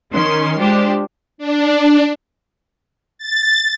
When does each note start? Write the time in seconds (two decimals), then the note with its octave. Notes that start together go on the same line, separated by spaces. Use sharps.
0.12 D#3 C#4 C6
0.58 G#3 D4 F4 G4 C5
1.38 D4
3.18 A6